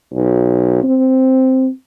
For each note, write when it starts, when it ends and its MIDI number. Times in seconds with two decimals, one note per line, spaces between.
0.14 0.80 35
0.83 1.69 60